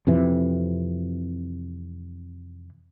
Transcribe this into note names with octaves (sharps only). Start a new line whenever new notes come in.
F2 C3 E3